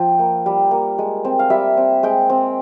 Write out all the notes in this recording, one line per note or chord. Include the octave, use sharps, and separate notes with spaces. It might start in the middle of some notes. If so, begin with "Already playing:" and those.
Already playing: F3 G5
A#3
G3
A#3
G#3
C4
F5
G3 E5
C4
G#3 G5
C4